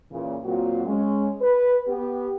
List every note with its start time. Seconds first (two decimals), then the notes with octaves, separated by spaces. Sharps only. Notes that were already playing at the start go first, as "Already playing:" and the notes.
0.12 A#2 C#3 E3
0.45 A#2 F#3 A#3 C4 F4 F#4
0.86 G#3 C#4
1.42 B4
1.88 B3 G4